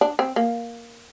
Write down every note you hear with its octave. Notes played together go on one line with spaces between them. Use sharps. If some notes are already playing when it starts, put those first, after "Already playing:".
D4
C4
A#3